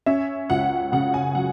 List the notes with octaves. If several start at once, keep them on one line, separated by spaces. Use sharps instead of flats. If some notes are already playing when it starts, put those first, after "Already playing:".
C#4 E5
C#2 F#5
C#3 F#5
G#5
F#3 F#5